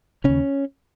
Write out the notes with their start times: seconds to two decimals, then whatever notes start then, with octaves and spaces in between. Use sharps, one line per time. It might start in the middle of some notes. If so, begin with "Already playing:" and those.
0.24 D#2 C#3 C#4